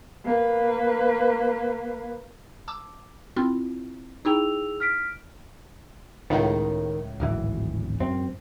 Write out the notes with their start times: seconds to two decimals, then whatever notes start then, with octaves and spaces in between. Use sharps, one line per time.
0.24 A#3 B4
2.68 A5 D6 E6
3.36 C4 E4 F4
4.25 D#4 E4 G#4 G5 E6 F7
4.80 F6 B6 D7
6.30 C#2 A2 D#3
7.20 D1 G#1 E3
8.00 F#2 C4